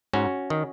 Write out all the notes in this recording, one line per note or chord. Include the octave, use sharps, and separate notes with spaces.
G#2 C#4 F#4
D#3